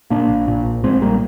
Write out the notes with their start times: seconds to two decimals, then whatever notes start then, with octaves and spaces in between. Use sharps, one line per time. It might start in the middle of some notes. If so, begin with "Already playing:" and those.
0.10 A#2 A#3 D4
0.29 A#1
0.48 A#2
0.65 A#1
0.83 A#1 G#3 C4
1.01 A#2 G3 A#3